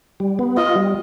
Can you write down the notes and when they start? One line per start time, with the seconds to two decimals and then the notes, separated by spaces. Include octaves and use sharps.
0.20 G3
0.39 B3
0.57 F4 D#5
0.76 G3